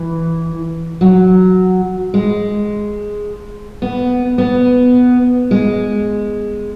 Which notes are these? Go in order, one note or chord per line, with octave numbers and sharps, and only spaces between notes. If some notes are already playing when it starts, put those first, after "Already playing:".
Already playing: E3
F#3
G#3
B3
B3
G#3